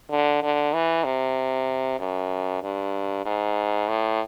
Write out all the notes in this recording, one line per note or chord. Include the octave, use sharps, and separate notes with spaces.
D3
D3
E3
C3
F#2
G2
G#2
A2